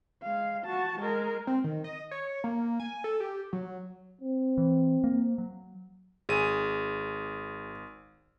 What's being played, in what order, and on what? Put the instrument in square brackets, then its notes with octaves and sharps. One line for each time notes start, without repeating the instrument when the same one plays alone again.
[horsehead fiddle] G#3 F5
F#4 A5
G#3 A#4
[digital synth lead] C4
D#3
D#5
C#5
A#3
G#5
A4
G4
F#3
[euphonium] C4
[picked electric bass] E3
A#3
F#3
[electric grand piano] G#1 D#7 [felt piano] G#4